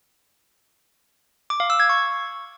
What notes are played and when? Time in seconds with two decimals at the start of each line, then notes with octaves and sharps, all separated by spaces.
1.50 D6
1.60 F5
1.70 E6
1.80 G#6
1.89 C#6